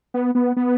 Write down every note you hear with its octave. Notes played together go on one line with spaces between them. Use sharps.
B3
B3
B3